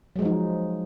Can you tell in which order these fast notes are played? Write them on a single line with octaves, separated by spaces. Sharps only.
F#3 G#3 F3 D#4